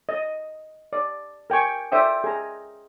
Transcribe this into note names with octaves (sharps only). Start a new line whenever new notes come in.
D#5
D5
A#4 G5 G#5 C#6
C5 D5 E5 G5 D#6
G#4 A#5